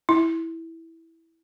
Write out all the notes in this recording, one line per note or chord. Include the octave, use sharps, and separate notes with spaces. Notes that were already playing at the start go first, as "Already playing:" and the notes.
E4